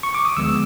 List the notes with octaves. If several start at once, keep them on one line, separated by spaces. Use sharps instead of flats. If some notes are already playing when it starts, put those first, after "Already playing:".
C#6
D6
D#6
D2 D3 F3 G#3 B3 E6